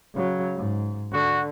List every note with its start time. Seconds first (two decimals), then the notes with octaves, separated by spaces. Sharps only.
0.16 C#3 F#3
0.56 G#2
1.12 D3 F#4